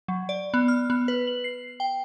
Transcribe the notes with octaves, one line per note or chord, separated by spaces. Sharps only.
F#3
D5
B3
F6
B3
B4
F#7
C7
G5